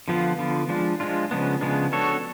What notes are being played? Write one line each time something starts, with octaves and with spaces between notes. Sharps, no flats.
D3 F3 B3 F4
D3 F3 B3 F4
F3 G#3 D4 F4
F3 G#3 D4 F4
C#3 F3 G#3 B3 D4
C#3 F3 G#3 B3 D4
B3 D4 F#4 A4 C#5